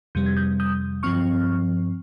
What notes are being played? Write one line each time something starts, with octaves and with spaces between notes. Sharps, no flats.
F2 C3 G3 G6
G#6
D#6 G6
D#6 G6
G2 F3 C4 C#6 F6